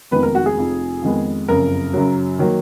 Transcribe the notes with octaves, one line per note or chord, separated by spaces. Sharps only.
F1 F2 D#3 G#3 B3 B4
A#4
F#4
G#4
F1 F2 F3
F2 D#3 G#3 B3
F#1 F2 C#3 A#4
F#2 C#3 F#3
D#3 F#3 A#3